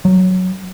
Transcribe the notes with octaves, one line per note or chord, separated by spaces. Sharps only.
F#3